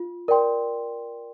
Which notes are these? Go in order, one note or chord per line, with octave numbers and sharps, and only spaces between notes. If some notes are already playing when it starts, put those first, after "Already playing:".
Already playing: F4
A#4 D5 G5 C6